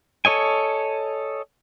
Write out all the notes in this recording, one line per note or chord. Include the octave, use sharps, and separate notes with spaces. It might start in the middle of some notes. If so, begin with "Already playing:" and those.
A4 C#5 D#5 G#5